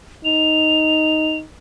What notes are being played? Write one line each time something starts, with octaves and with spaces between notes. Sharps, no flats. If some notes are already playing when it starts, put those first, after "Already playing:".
D#4 F7